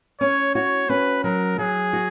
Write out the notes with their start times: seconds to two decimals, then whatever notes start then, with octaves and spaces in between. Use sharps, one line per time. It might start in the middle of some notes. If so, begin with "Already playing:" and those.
0.20 C#4 C#5
0.55 F#4 C#5
0.89 C#4 B4
1.24 F#3 A#4
1.58 F#3 G#4
1.93 F#4